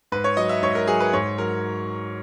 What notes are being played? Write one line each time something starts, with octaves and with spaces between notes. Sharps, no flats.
G#2 B4
C#5
F#3 D#5
E5
G#2 C#5
A#4
F#3 G#4
B4
G#2 C#5
F#3 A#4